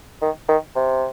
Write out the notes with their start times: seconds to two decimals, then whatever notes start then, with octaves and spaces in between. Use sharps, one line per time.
0.22 D#3
0.49 D#3
0.76 C3